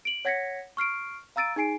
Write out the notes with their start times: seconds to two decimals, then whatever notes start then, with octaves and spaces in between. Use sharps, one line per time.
0.05 D7 F#7
0.25 C#5 F#5 G#6 A#6 B6 C#7
0.77 C#6 F6 C7 D7
1.36 F5 A#5 E6 A6 D7 D#7
1.56 D#4 G#4 G#5 C7 D7